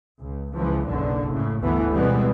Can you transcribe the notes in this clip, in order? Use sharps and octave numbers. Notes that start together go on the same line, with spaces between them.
C#2
C#2 E3 F3
F#1 B1 D3
A2 C#3
G1 D2 E3 A3 B3
B2 E3 G3 G#3 B3 C4